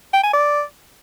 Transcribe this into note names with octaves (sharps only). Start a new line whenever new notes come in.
G5
G#5
D5